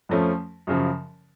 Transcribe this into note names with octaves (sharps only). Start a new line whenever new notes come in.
F2 F3 A3 C#4
F#2 C#3 F3